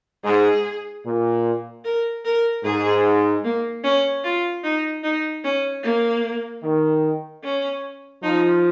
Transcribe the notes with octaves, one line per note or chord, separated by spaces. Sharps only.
G#2 G#4
A#2
A#4
A#4
G#2 G#4
A#3
C#4
F4
D#4
D#4
C#4
A#3
D#3
C#4
F3 D#4